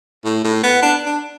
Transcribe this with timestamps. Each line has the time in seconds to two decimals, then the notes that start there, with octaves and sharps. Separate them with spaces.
0.25 A2
0.44 A2
0.63 B3
0.82 D4
1.06 D4